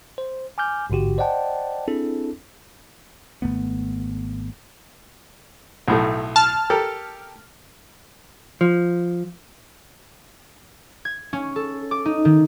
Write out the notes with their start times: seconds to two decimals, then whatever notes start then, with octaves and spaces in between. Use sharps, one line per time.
0.18 C5
0.58 G#5 D6 F6 G6
0.90 A1 G#2 D3 F#4 G4
1.18 C5 D5 D#5 F#5 G5 A5
1.88 C4 D4 E4 G#4 A4
3.42 G#1 A2 A3 B3
5.88 B1 A2 A3
6.36 A5 F6
6.70 G4 A4 A#4
8.61 F3
11.05 G#6
11.33 C#4
11.56 A4
11.91 D6
12.05 D#4
12.25 D#3